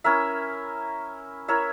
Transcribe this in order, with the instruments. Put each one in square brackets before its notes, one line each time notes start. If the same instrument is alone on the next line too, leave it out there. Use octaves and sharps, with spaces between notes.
[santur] C#4 E4 A#4 E5
E4 A#4 C#5 E5